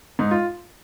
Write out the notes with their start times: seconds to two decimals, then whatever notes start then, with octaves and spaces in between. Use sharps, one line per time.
0.19 G#2 D#4
0.31 F4